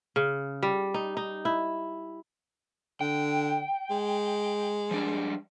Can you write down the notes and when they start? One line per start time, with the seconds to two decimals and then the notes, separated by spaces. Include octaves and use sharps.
0.16 C#3
0.63 G3
0.94 D#4
1.17 D#4
1.45 E4
3.01 D3 G5
3.90 G#3
4.91 F3 G3 D4